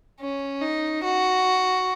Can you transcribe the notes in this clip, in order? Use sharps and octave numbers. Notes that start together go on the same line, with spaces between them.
C#4
D#4
F#4